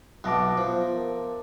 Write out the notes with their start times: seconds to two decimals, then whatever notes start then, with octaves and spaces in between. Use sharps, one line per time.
0.24 B1 B3 E5 A5 D6 F#6 A#6 D7
0.57 F3 B3 C5
0.93 A#4